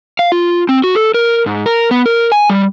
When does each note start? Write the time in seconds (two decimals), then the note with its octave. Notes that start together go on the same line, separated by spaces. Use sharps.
0.19 F5
0.32 F4
0.69 C4
0.84 F#4
0.95 A4
1.14 A#4
1.46 G#2
1.66 A#4
1.91 B3
2.06 A#4
2.32 G#5
2.50 G3